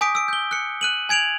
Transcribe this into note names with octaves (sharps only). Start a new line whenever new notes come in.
G#5 D6 D#6 G6 B6 D7
E6 D7
G6 G7
F#6 C#7
F#6 D#7 F#7
G#5 G#6 D7 F7 F#7